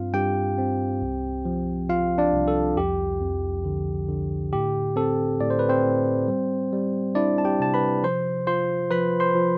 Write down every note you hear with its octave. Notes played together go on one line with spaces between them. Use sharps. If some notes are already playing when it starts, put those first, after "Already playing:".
Already playing: G2 C4 F4 F5
G2 G4 G5
C4
C2
F3
F3 F4 F5
D4 D5
C2
A4
F2 G4
F2
D3
D3
A2 G4
C4 A4
A2 D5
C5
B4
C4 C5
A2
G3
G3
D4 E4 D5
A5
G4 G5
C3 A5
B4 B5
F3 C5 C6
F4 C5 C6
F3 B4 B5
C5 C6
F3